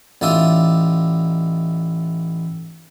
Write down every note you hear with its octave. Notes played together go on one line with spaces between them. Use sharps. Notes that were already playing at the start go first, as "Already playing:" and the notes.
A1 D#4 F4 D5 E5 D#6